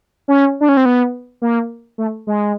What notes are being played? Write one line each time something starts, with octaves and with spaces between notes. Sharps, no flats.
C#4
D4
C#4
C4
B3
A#3
A3
G#3